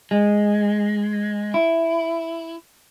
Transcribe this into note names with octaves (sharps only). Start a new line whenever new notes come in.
G#3
E4